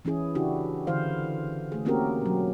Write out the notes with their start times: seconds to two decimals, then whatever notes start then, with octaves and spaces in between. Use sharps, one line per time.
0.05 E3 C#4 E4 G#4
0.35 C#3 D4 E4 F#4 G4
0.87 D3 E3 E4 C5 F5
1.72 A3 G#4
1.85 A#3 C4 C#4 F#4 G4 A#4
2.22 B2 F#3